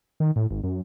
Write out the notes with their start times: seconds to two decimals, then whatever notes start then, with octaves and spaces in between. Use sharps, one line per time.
0.20 D#3
0.36 A2
0.51 G#1
0.64 F#2